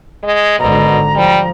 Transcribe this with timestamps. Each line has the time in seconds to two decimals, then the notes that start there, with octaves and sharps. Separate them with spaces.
0.23 G#3
0.59 G#1 B2 D3 A#5
1.16 F3 G3